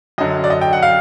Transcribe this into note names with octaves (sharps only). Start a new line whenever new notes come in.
F#2 D3 F#3 D#5
D5
D#5
G5
F#5
F5